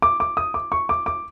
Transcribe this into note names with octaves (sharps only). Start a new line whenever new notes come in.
D6
D6
D#6
D6
C#6
D6
D6